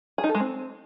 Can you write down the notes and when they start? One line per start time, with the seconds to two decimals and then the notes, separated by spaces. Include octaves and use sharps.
0.18 G#4
0.24 D#4
0.29 A4
0.35 G#3
0.40 C4